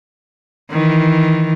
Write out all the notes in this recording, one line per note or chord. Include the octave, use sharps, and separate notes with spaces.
D#3 E3